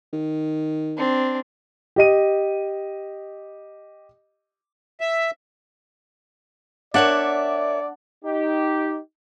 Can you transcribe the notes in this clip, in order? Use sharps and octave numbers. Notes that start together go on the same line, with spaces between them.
D#3
C4 D4
G4 D#5 D#7
E5
D4 A#4 C#5 D5 E5 F#5
D#4 G4